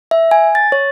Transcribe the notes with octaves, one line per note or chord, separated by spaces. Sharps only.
E5
G#5
A6
C#5